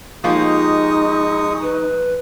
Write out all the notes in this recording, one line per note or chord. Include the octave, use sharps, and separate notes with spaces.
F3 G#3 A#3 D#4 G4 C#6 D#6
B4